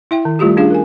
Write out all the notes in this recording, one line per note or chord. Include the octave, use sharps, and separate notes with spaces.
E4 E5 G5
D#3
G3 A3 F4 G4 A4
C#4 D4 F4 G#4 F5
A#4 G#5